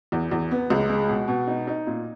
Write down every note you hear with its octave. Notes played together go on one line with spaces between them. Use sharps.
E2
E2
B3
C#2
G#3
B2
B2
D#4
D#4
A#2